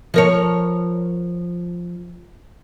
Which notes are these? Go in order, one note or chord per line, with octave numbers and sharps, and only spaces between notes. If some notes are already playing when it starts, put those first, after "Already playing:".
F3 A#4 C#5